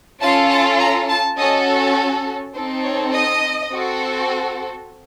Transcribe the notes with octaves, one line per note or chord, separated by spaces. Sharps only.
C#4 F4 A4 A5
A5
A#5
A5
C#4 F#4 A4 D#5
C4 D#4 A4 C5
C#5
D#5
C4 F#4 A4